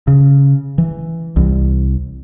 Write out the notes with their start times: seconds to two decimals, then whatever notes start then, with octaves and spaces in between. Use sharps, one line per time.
0.07 C#3
0.78 E3
1.36 C2